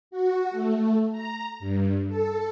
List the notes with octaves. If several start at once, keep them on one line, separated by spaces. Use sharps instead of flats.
F#4
A3
A#5
G2
A4